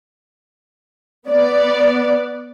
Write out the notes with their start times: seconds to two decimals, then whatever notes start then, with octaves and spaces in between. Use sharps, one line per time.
1.29 B3 D5